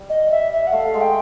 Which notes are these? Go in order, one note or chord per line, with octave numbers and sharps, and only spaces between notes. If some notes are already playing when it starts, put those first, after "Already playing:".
Already playing: G3
D#5
E5
E5
F#5
A3 F5
G#3
G5